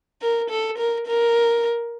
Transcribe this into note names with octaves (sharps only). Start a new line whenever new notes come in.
A#4
A4
A#4
A#4